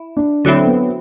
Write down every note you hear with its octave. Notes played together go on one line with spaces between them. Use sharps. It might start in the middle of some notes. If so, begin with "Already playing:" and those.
Already playing: E4
D4
D3 F#3 A3 C4 D4 E4
B3